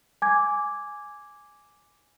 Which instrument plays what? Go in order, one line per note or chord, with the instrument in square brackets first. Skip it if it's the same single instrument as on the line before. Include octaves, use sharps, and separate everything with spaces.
[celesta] G#5 D6 G#6